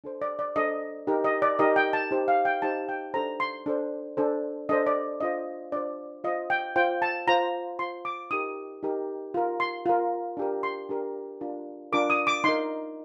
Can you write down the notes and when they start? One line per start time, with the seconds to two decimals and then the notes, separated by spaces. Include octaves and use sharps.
0.04 D4 A4 C5
0.22 D5
0.39 D5
0.56 D4 A4 C5 D#5
1.07 D#4 G4 A#4
1.24 D#5
1.42 D5
1.59 D#4 G4 A#4 D#5
1.76 G5
1.93 A5
2.11 D#4 G4 C5
2.28 F5
2.45 G5
2.62 D#4 G4 C5 A5
2.89 G5
3.14 D4 A4 C5 A#5
3.40 C6
3.66 D4 A4 C5
4.17 D4 A4 C5
4.69 D4 A4 C5 D#5
4.86 D5
5.21 D4 F4 C5 D#5
5.72 D4 F4 C5 D5
6.24 F4 C5 D#5
6.50 G5
6.76 F4 C5 G5
7.02 A5
7.27 F4 C5 A#5
7.79 F4 C5 C6
8.05 D6
8.31 D#4 G4 A#4 D#6
8.83 D#4 G4 A#4
9.34 F4 A#4
9.60 C6
9.86 F4 A#4
10.37 D4 G4 A#4
10.63 C6
10.89 D4 G4 A#4
11.41 D4 F4 A#4
11.92 D4 F4 A#4 D6
12.10 D#6
12.27 D6
12.44 D#4 A#4 C6